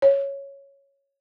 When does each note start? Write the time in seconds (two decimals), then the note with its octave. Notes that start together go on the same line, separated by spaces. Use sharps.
0.02 C#5